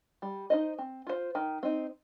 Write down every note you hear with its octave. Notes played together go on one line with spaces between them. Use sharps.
G3
D#4 C5 D#5
C4
F4 C5
D#3
C4 D#4